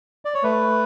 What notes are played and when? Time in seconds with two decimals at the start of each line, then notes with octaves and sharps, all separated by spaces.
0.25 D5
0.34 C#5
0.43 A3 B4